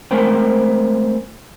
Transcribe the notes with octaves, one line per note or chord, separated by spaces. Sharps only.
G#3 A3 C4 A#4 C5 G5